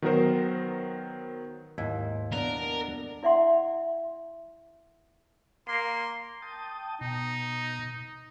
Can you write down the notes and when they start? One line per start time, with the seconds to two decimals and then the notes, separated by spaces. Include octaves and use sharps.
0.02 D#3 F#3 B3 D#4 A#4 C5
1.78 D#2 G#2 E4 F#5
2.33 B3 D4 A#4 D5
3.23 E4 D5 E5 F#5 C6
5.68 A#3 C6
6.42 G5 A5 D#6
7.01 B2 D#4